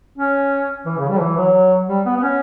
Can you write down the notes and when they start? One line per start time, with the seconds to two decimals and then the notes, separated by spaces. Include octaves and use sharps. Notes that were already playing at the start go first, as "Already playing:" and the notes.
0.18 C#4
0.86 E3
0.98 C#3
1.09 G3
1.20 E3
1.37 F#3
1.88 G3
2.06 B3
2.16 B3
2.23 C#4